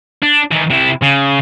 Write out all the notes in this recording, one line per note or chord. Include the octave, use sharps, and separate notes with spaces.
D4
D#3 E3
C3 E4
C#3